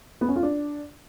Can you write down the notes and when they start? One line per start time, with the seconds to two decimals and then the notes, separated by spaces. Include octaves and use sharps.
0.21 B3
0.28 C#4
0.36 F4
0.43 D4